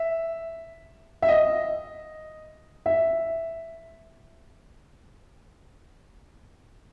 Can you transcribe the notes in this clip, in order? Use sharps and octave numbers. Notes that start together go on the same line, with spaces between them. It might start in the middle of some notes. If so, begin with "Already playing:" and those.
Already playing: E5
E5
D#5
E5